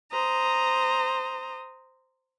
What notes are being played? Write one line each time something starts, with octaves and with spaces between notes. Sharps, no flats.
C5 A#5 D#6